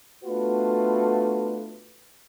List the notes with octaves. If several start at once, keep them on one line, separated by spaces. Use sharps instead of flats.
A3 B3 D4 F4 F#4 B4